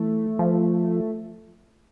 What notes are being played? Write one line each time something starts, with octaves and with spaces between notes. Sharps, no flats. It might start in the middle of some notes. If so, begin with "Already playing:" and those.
Already playing: E3 A3
F3